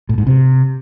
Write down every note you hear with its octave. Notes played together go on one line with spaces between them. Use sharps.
A2
G#2
C3